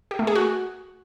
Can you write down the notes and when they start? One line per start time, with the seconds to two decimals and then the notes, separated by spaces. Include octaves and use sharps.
0.11 G4
0.19 A3
0.27 G#4
0.35 F#4